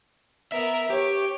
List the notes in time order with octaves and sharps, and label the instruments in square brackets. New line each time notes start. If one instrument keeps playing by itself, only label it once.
[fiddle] B3 A#4 [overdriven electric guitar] E5
[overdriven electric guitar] G4 [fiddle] C#5